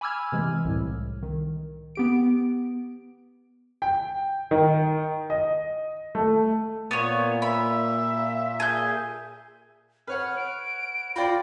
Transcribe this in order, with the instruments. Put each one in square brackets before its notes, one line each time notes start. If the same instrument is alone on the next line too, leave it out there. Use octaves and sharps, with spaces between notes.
[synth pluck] G#5 B5 D6 E6 F6 G#6
C3 E3 G#3
C2 A2
D#3
B3 G4 D7
[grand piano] G5
D#3
D#5
A3
[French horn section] A#2 [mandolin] B3 C#5
[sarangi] E5 [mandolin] B5
[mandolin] G#4 G6
[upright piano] B4 C#5 F#5 [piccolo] F6
[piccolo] D7
[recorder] F4 [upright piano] D5 G5 B5 [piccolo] A#6